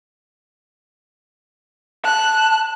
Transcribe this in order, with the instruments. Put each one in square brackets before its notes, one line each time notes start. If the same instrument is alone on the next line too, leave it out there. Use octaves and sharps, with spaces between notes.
[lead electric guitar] A5 [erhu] F#6